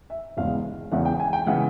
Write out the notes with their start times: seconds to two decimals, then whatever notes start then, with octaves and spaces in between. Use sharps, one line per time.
0.10 E5
0.37 E1 E2 C#3 E3 G#3 F5
0.92 E1 E2 C#3 E3 G#3 F#5
1.05 G5
1.20 G#5
1.33 G5
1.46 C#3 E3 G#3 F#5